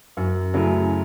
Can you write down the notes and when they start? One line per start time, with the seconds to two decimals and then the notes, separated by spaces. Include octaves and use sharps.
0.17 F#2
0.54 C#3 F#3 A3 E4